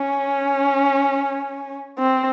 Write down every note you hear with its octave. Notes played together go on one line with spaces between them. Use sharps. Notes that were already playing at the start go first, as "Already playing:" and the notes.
Already playing: C#4
C4